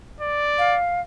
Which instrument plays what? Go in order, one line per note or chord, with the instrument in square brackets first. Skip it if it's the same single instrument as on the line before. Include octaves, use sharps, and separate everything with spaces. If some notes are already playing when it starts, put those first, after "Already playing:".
[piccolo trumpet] D5
[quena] F5